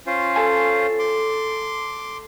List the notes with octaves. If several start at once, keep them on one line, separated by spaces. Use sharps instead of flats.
C#4 F4 C5
A4 G#5
C6 D6